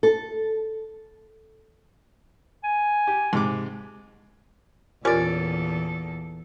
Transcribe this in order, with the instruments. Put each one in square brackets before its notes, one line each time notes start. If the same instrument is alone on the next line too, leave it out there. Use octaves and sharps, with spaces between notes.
[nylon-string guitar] A4
[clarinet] G#5
[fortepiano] G4
G#2 C3 D6
[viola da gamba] E2 A#2 A4 [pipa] C#4 D5 [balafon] F4 G4 A#4